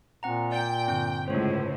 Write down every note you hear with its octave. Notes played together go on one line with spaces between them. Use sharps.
A#2 C4 F#5 A#5
D5 G5
G2 D3 C4 G6
C#2 A2 C5 C#5